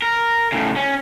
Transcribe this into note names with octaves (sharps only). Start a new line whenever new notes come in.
A#4
A2 C#3
C#4